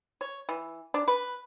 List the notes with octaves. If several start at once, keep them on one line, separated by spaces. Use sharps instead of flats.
C#5
E3
D4
B4